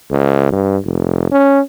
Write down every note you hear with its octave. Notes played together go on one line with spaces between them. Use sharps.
C#2
G2
F1
C#4